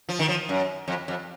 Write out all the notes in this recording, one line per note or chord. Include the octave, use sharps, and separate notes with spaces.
F3
D#3
F3
F#2
F2
F2